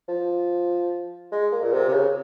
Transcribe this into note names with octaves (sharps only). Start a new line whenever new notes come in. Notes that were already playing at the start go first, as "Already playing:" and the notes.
F3
G#3
A#3
A#2
C3
C3
C#3